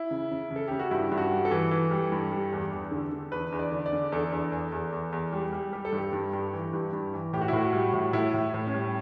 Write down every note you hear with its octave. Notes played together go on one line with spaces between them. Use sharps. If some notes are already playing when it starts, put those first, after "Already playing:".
Already playing: E4
C#3
C#3
C#3
A4
C#3 G4
F#4
G2 E4
G2
F#4
G3
A4
E3
E3
G3
G2
G3
E2
E2
D3
D3
E2 B4
E2
D5
D3
D5
D3
E2 A4
E2
E2
E2
E2
E2
G3
G3
G3 G4
A4
G2 G4
G2
G2
E3
G2
G2
E3
A2 G4
F#4
E4
A2 F#4
G3
A2
A2 E4
A2
A2
C#4
G3